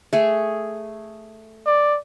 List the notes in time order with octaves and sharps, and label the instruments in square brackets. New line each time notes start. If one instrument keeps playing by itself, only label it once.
[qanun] A3 G#4
[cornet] D5